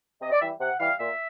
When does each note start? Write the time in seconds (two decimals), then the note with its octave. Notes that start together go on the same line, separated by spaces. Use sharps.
0.21 C3 D#5
0.31 D5
0.41 E3 G3 E5
0.60 C3 F#5
0.80 E3 G3 F5
0.99 A#2 E5